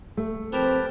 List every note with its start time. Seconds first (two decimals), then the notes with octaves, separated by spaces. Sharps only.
0.17 A3
0.52 F3 C4 G4 A#4 B4 A5